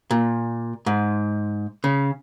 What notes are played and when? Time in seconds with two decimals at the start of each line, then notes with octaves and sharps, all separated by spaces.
0.11 A#2
0.86 G#2
1.84 C#3